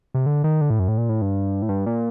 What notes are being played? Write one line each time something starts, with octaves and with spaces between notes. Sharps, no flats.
C3
D3
D#3
D3
A2
F#2
A2
A#2
A2
G2
A2
G2
A#2